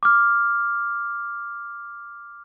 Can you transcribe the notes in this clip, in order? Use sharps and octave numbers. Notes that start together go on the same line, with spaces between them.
D6 F6